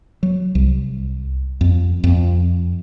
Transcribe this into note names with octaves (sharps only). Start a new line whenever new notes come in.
F#3
C2
F2
F2